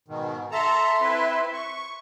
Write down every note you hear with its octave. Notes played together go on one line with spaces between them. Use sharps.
G#2 B2 D#3
A4 E5 A5 A#5 C6
C4 E4 B4
C#6